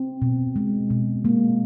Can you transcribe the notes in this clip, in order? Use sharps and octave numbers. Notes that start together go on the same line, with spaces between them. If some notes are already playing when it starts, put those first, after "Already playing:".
Already playing: C4
B2
G#3
B2
G#3 A#3